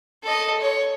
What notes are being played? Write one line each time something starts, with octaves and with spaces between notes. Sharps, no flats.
A4 D#5
C#5